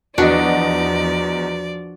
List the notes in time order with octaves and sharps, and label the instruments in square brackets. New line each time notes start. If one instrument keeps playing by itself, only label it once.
[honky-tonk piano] E2 D#5 [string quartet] F3 D5 [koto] D4 [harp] F#4